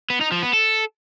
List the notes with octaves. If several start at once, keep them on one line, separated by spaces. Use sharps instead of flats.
B3
D#4
F3
B3
A4